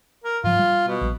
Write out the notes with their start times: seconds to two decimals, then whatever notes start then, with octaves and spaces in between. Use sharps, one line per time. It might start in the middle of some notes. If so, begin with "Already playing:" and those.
0.24 A#4
0.44 G#2 F3 F4
0.59 G3
0.88 B2
1.01 A#1